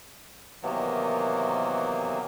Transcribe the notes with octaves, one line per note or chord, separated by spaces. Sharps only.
C3 D#3 E3 F#3 A#3 B3